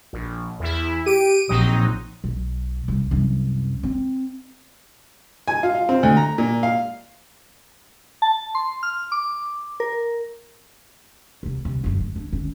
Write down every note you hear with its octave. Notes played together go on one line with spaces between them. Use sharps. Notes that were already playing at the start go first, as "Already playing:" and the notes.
A#1
E2 E4
G4 D7 D#7
A#1 F#3 C4 D#4 D#6
B1
C2
C2 F#2
C4
G#5
F4
F4
C4
D2
A#5
A#2
F5
A5
C6
F6
D6
A#4
C3 B3
C3 G3
G1 F#2
A3
D4
D#3 C#4